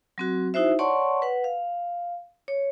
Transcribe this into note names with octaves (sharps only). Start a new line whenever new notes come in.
F#3 C4 F#4
D#4 E4 F#4 C5 E5
C#5 D5 F#5 A5 C6 C#6
B4 F#5
F5
C#5